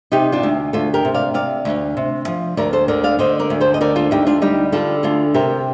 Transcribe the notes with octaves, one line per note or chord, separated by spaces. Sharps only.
C3 D#4 G4
D4 F4
D2
D2 F4 A4
G4 A#4
C3
D5 F5
C3 D5 F5
D2
C3
F3
D2 A#4 D5
A4 C5
D3 A#4 D5
D5 F5
D3 C5 D#5
A#4 D5
D2
A4 C5
D#5
D3 A#4 D5
F4 A4
D2 D#4 G4
D4 F4
G3 D#4 G4
D3 F4 A4
D2 F4 A4
C3 G4 A#4